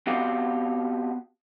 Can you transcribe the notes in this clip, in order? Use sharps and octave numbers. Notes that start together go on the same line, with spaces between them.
B3 C4 F#4 G4 F5 G5